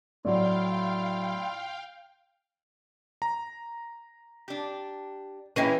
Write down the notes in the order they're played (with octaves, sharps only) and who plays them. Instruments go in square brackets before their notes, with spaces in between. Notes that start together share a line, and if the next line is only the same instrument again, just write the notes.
[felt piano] A2 F#3 [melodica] E4 F4 [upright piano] D5 [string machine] F5 G5
[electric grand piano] A#5
[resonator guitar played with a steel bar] D4 G4
[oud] E3 G#3 E4 [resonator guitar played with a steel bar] A#3 C#4 [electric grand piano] G5 A#6 D#7